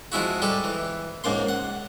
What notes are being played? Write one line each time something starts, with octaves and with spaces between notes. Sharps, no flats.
F3 G#3 E4 F#4
G3 G#3 A4
E3
C#2 G#2 A#3 C6
F#5